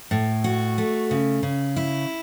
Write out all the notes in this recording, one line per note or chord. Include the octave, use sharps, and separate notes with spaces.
A2
F#4
A3
C#3
C#3
E4